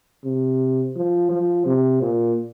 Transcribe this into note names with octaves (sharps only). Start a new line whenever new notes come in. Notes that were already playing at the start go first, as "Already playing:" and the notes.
C3
F3
F3
C3
A#2